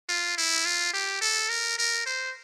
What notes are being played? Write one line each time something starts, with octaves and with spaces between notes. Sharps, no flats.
F4
E4
F4
G4
A4
A#4
A#4
C5